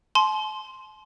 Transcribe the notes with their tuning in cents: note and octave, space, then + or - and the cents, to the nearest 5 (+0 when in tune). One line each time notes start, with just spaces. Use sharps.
A5 -45 C6 +0